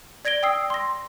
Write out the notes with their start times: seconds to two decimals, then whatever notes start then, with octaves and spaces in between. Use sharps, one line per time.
0.25 D5 G#6 A#6 D7 G7
0.43 G5 D#6 E6 C7
0.70 C6 A#6